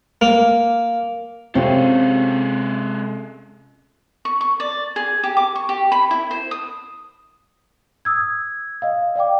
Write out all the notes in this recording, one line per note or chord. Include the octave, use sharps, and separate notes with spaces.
A#3
C3 G#3 C4 C#4 F4 A4
C#6
C#6
D5
G#4
G4
D6
C#6
G4
B5
E4
C5
D#6
D#6 E6 G#6
D#5 F5
D5 F5 G5 D6